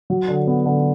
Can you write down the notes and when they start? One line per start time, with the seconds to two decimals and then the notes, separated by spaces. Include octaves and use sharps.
0.10 F#3
0.28 D3
0.47 B3
0.66 D3